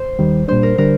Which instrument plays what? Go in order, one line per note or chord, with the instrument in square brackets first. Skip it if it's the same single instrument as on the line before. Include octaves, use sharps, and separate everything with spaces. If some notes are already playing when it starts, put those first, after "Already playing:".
Already playing: [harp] C5
[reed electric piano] D#2 D#3 G3
[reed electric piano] A#2 G3 D4 [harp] C5
[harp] A#4
[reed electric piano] D3 G3 D4 [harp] A#4